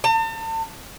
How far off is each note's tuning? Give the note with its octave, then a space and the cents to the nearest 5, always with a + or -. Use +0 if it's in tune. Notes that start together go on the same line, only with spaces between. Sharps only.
A5 +40